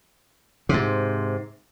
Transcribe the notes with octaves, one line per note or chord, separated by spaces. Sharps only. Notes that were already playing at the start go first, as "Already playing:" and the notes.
G#2 C3